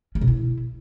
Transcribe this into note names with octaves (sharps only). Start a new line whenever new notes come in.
C#4
B2
E4